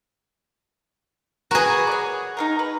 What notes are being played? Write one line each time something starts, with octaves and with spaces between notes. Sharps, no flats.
F#4 G#4 A#4 B4
C#5 D5
D#4 F4 A#4
B4